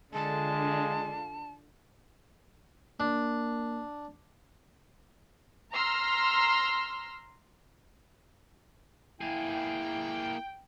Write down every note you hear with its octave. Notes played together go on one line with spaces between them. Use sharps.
D3 G#3 D4 F4 A5
A#3 D4
A#5 C6 E6 F6
A#3 E4 G#4 G5